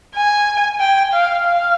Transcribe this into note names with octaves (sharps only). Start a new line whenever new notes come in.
G#5
G5
F5
F5